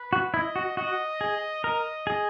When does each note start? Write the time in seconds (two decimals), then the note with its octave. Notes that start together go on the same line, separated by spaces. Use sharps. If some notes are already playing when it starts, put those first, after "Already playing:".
Already playing: B4
0.13 F#4
0.33 E4 D#5
0.56 F#4
0.77 F#4 D#5
1.21 G#4
1.64 A#4 D#5
2.07 G#4